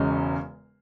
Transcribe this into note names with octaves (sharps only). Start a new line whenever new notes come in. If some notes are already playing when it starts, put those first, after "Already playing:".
Already playing: E1 E2 C#3 G#3 C#4